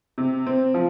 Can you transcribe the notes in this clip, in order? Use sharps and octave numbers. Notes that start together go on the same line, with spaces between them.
C3
C4
F3